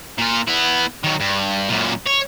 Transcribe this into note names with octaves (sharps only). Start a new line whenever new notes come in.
A#2 F4
B3 E4
D#3 F#3
G2
F#2 A#2
C#5